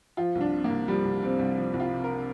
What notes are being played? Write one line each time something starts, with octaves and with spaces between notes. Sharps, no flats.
F3 F4
C2
D4
C3
A#3
C2
F3 G3
C2
C3 C4
C2
F3
C2
F4
C3
A#4